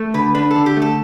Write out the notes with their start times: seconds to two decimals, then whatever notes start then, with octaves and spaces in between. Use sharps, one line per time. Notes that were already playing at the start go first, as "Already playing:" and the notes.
Already playing: A3
0.14 D3 B4
0.35 D4 B4
0.51 A4
0.56 D3
0.66 G4
0.77 A3
0.82 A4